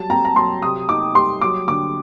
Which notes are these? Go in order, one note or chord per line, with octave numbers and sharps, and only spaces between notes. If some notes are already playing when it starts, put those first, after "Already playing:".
Already playing: F#3 G3 A5
C4 A#5
A#5
F#3 C6
C3 D#6
D#4 D6
G3 C6
F#3 D6
D3 D6